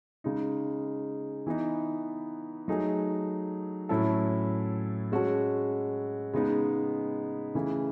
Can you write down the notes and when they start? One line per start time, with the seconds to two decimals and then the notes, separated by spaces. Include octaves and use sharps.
0.24 C#3 G#3 D#4
1.46 E3 B3 D#4
2.68 F#3 A3 D#4 G#4
3.89 A2 F#3 C#4 E4 A4
5.12 G#3 C#4 F#4 A4
6.34 C#3 G#3 B3 D#4
7.55 C#3 E3 A3